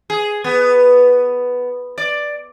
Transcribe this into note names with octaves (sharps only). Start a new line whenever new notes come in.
G#4
B3
D5